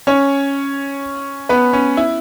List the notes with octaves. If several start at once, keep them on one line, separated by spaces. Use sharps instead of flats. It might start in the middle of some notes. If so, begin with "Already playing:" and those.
C#4 C#5
B3 B4
C#4
E4